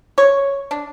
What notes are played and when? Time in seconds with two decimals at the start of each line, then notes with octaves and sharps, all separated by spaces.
0.18 C#5
0.71 D4